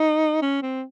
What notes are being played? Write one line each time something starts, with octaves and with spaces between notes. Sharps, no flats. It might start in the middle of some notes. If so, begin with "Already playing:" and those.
Already playing: D#4
C#4
C4